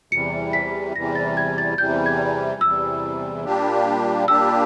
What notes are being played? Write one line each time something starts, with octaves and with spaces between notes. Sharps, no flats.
E2 C3 E3 G3 C#7
B6
E2 C3 E3 G3 A#6
A6
G#6
A6
E2 C3 E3 G3 G6
G#6
E2 C3 E3 G3 E6
A#2 G3 A#3 D4 G4
A#2 G3 A#3 D4 G4 E6